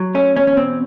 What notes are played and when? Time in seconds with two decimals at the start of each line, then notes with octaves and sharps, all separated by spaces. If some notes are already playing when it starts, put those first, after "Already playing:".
Already playing: F#3
0.15 A3 C#4
0.36 E2 C#4
0.47 C#4
0.57 B2 C4